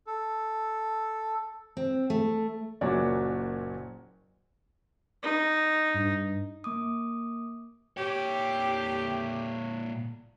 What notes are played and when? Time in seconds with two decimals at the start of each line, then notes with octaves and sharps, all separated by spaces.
0.07 A4
1.77 C4
2.10 A3
2.81 F#1 A#2 F#4 C#5 D5
5.23 D#4
5.94 G2
6.64 A#3 D6 D#6
7.97 A#2 G4 C#5